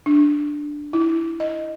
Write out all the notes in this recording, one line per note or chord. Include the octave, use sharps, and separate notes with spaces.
D4
E4
D#5